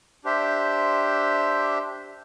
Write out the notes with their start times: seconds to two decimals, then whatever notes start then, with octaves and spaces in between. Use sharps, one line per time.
0.24 D4 G4 C5 E5